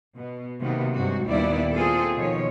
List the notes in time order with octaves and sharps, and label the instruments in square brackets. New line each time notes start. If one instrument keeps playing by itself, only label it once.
[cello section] B2
C3 D#3 F#3 A#3 B3
G2 C3 G#3 F#4
D#2 A#2 G3 B3 E4 D5
A#3 C4 F4 G#4 A4
B2 D#3 F3 C#5